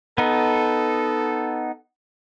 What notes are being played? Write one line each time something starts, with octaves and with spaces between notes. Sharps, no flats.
B3 D#4 A4